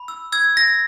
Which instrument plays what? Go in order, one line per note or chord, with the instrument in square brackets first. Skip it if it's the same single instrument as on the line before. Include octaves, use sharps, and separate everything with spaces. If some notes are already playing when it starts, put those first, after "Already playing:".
Already playing: [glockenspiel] B5
E6
E6 G#6
E6 A#6